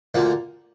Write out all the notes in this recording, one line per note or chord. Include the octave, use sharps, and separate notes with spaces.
D2 D3 F3 A#3